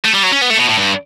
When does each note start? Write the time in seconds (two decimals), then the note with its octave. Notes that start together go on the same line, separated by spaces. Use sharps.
0.05 A3
0.14 G3
0.23 F#3
0.32 C#4
0.42 B3
0.50 A3
0.59 B2
0.69 A2
0.78 G2